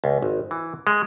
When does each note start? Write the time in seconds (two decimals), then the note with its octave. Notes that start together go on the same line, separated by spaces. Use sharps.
0.04 C#2
0.22 G#1
0.51 E3
0.87 G#3